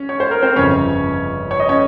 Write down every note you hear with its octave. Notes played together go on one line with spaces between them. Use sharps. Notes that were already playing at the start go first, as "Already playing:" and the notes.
Already playing: C#4
C#5
C5
A#4
C4 C5
G1 F2 C#3 C#4 C#5
C#5
D#5
C#4 C#5